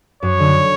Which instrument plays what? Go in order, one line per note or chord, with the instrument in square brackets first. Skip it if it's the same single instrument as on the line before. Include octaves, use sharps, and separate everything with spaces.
[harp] F#2 [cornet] C#5
[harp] D3